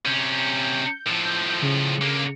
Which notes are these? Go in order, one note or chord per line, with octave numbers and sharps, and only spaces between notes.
C3 C#4 G6
A2 F3
G6
C#3
D3 A#3